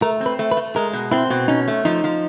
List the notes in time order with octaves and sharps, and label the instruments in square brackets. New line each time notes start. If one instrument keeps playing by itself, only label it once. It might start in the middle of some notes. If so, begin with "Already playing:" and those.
[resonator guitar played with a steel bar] A3 [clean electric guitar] A#4
[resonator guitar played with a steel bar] C4
[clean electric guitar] B4
[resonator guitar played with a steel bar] A3
[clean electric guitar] B4
[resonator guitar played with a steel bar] A3
[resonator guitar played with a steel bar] G#3 [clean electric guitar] A#4
[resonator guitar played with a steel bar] B2
[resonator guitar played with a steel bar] C4 [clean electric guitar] E4
[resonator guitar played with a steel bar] B2
[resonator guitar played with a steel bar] C#4 [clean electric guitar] D#4
[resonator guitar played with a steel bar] A3
[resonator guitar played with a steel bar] F3 [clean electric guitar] D#4
[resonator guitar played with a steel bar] F3